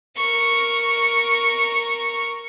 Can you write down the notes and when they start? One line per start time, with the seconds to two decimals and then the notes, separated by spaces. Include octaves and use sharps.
0.16 A#4 C#6